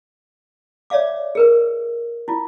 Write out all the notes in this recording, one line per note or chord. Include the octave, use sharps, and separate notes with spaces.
C#5 D5 E5 F5 D6
G#4 A#4 B4
E4 F4